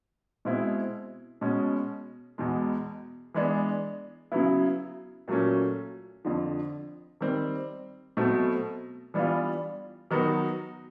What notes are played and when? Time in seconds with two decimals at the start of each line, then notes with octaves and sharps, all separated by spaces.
0.45 B2 G#3 C4 E4
1.41 B2 G#3 C#4
2.38 E2 B2 G#3
3.34 E3 G#3 B3 D4
4.32 C#3 F#3 B3 E4
5.28 A#2 F#3 A3 C#4
6.25 F2 D3 F3
7.21 D#3 G3 C4
8.17 B2 F#3 A3 C4
9.14 E3 G3 B3 D4 F4
10.11 D#3 F#3 B3 D#4 F#4